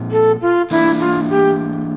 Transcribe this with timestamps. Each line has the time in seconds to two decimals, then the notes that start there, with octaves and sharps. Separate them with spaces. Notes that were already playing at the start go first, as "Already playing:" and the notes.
Already playing: A#2 F3 C4 F4
0.11 A4
0.42 F4
0.71 E3 A#3 D4 E4
1.00 F4
1.30 G4